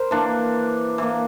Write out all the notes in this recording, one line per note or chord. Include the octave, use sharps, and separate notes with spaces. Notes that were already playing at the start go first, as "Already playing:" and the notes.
Already playing: A#4 C5
E3 A#3 D4
E3 A#3